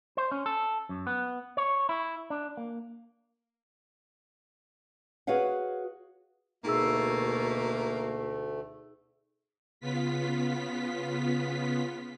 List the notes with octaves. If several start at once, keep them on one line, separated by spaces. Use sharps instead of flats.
C5
C#4
A4
F#2
B3
C#5
E4
D4
A#3
F#4 G#4 B4 C#5 F5 F#5
D2 B2 A3 A#3 D#4 G#4 E6
C#3 B3 F4 B6